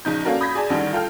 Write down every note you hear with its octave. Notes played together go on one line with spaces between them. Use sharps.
A#1 C#3 D#4 G6
A#3 C#4 D4 F#4 A4 A#4
B5 D#6 G6 G#6 A#6 B6
G#4 D5 G#5 A5
A1 D3 D#3 G3
F4 A4 G5 F6